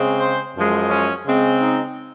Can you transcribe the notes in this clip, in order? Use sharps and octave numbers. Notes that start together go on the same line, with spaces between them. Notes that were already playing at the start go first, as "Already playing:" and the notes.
Already playing: C#3 G#3 C4
C5
F#2 F3 G#3
C#4
C#3 G#3 C4
D#4